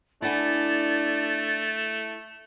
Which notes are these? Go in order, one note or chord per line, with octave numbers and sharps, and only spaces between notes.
A3 D4 E4 F#5 G#5 A6